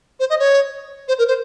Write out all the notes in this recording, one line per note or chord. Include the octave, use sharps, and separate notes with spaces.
C5
D#5
C#5
C5
A#4
C5